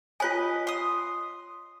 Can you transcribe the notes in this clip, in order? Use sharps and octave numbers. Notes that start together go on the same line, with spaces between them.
F4 B4 C#5 D#5 G#5
C6 D#6